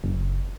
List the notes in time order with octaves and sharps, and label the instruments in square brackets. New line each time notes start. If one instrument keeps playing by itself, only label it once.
[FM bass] F#1